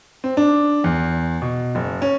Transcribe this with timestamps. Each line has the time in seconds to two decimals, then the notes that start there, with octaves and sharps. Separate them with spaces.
0.24 C4
0.37 D4
0.84 E2
1.42 B2
1.75 F#1
2.02 C#4